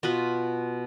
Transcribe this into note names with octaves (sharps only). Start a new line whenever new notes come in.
B2 B3 F4 B4